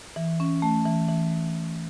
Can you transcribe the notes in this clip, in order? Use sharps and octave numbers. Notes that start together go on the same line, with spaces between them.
E3
C#4
A3
E3
E3